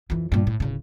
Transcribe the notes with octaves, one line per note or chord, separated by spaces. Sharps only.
F2 E3
G2 A#2
A2
D1 C#3